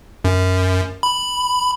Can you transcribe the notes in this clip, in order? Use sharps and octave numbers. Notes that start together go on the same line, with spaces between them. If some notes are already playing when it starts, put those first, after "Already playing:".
F#2
B5